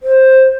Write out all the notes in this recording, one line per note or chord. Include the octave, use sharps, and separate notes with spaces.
C5